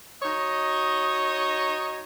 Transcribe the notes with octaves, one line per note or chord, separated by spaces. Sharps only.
D#4 F#4 C#5 D#5